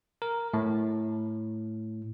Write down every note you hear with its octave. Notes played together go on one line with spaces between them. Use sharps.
A#4
A2